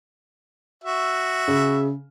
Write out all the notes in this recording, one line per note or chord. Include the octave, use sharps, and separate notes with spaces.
F#4 E5
C#3